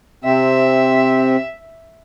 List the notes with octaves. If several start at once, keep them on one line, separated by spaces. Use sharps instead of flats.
C3 C4 E5